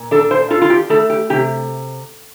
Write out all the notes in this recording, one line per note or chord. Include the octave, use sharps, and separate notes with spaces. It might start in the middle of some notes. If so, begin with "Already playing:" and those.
Already playing: A#2
D4 A4
C5
F4 A4
F4
G4
A3 A4
G4
C3 G4